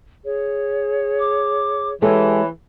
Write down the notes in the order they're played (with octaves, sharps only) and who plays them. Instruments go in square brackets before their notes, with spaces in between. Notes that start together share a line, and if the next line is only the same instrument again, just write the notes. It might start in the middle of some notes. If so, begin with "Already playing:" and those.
[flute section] G#4 C#5
[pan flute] D6
[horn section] E3 [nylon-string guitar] G#3 G4 A4 [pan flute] C#5